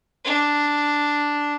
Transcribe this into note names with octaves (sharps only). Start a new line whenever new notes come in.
D4